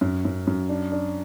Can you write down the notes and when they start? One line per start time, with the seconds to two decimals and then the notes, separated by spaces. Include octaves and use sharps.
0.01 F#2
0.25 F#2
0.47 F#2
0.69 D4
0.92 D4